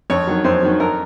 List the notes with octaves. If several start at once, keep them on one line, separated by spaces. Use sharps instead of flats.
F2 C#5
D#3 F#3
F2 C5
D#3 F#3
F2 A#4